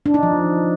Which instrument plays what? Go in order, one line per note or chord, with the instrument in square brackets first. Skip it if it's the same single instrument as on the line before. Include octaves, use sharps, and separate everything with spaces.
[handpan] D4
D#4
F3